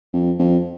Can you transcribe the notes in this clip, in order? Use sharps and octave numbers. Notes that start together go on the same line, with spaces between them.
F2
F2